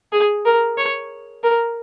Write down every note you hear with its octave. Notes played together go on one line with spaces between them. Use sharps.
G#4
A#4
C#5
A#4